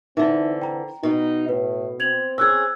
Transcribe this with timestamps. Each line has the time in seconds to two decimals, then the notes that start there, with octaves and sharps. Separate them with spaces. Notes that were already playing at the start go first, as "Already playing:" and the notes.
0.17 D3 E3 C4 D#4 E4 E5
0.62 G5 A#5
1.03 B2 D#4
1.49 A2 B4
2.00 C4 G#6 F7 F#7
2.38 C#4 G#4 E6 F#6 G#6